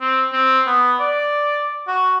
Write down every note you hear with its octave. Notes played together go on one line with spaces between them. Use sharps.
C4
C4
B3
D5
F#4